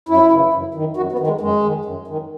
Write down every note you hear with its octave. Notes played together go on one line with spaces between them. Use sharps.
F#2 E4
C#3 E3
F#2
D#3
F#2 F#4
B3
D#3
G#3
F#2 G#3
D#3
F#2
D#3